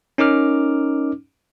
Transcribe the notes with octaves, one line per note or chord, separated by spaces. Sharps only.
C#4 D#4 A#4 D6 F6